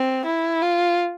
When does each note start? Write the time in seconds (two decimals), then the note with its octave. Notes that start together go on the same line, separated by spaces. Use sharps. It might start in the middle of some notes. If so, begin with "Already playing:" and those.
Already playing: C4
0.26 E4
0.62 F4